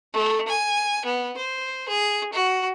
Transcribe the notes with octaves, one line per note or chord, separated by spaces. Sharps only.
A3
G#5
B3
C5
G#4
F#4